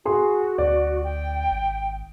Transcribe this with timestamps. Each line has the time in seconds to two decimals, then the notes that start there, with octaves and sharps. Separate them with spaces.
0.05 F#4 G#4 C6
0.58 D2 D5
1.04 G5
1.51 G#1